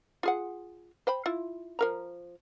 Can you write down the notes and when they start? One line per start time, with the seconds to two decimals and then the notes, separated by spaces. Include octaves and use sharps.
0.23 F4 G#4 F#5
1.07 C5 G5 B5
1.26 E4 F4
1.79 F3 A#4 A#5